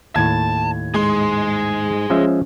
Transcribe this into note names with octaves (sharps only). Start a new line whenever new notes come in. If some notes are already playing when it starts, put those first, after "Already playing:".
D#2 A2 A5 G#6
G#2 G#3 G#4 C6
F3 G#3 C#4 E5